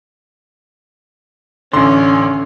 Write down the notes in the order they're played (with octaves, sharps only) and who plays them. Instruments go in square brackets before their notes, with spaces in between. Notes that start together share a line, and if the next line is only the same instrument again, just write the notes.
[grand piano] A1 C6 [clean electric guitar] D3 [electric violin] C#4